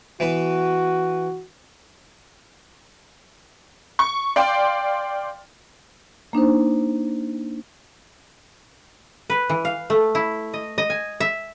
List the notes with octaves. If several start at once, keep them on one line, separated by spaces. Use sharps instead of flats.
E3 B3 F#4 B4
C#6
D5 F5 G5 C6
A#3 D4 D#4 C5
B4
E3
F5
A3
E4
D#5
D#5
G#5
E5